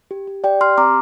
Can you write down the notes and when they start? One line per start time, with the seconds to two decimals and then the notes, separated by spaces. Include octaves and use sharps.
0.11 G4
0.27 G4
0.44 G4 D5 G5
0.61 G4 C6 F6
0.78 C4 A#5 D6